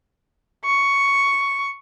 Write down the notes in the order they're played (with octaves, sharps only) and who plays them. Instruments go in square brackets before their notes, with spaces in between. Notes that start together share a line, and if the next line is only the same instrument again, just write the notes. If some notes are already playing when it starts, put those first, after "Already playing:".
[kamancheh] C#6